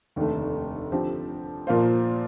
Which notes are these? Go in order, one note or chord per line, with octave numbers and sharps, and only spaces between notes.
F1 D#2 D3 A3
D3 F3 C4 G4
A#2 F3 A#3 F4 C5